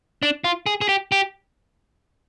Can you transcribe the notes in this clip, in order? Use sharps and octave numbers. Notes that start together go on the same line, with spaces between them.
D4
F4
G#4
G#4
G4
G4